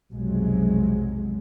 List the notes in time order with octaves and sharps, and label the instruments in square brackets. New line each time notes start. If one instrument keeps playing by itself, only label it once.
[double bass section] B1 F2 C3 F#3 G#3